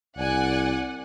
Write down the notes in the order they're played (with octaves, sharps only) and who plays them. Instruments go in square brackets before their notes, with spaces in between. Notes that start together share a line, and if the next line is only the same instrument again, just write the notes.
[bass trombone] C2 [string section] D5 F#5 G#5